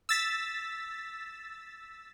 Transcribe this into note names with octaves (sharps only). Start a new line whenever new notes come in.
E6 A6 B6